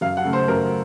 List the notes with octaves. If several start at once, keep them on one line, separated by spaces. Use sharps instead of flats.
F#2 F5
F#5
C#3 A3
C5
F#2 A#4